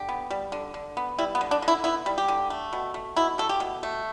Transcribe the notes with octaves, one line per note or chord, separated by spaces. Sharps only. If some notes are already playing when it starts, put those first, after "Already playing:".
Already playing: D3 G4
B3
G3
D3
D3
B3
G3 E4
B3
D3
D4
D3
E4
B3 E4
G3
G4
D3
A3
B2
A3
B2 E4
A3 A4
G4
B2
A3